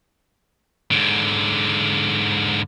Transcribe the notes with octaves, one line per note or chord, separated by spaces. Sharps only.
G#2 D3